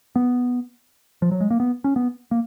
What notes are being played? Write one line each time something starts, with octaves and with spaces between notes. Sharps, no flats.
B3
F3
F#3
G#3
A#3
B3
C#4
B3
A#3